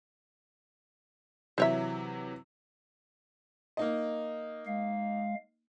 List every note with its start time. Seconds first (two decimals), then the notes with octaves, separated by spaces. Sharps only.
1.58 C3 E3 F#3 C5 C#5 E5
3.77 A#3 D#4 D#5
4.66 G#3 F5